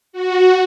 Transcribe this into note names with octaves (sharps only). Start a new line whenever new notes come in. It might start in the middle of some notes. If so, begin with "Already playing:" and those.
F#4